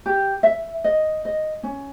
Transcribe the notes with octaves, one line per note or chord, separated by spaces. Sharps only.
G4
E5
D#5
D#5
C#4